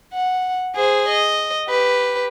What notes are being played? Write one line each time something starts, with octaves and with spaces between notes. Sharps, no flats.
F#5
G#4 C5
D#5
G4 B4